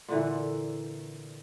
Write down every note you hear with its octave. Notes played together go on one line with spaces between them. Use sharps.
A#2 D3 E3